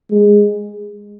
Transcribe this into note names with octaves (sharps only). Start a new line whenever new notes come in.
G#3